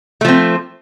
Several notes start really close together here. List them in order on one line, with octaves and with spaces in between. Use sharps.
A3 F3 C4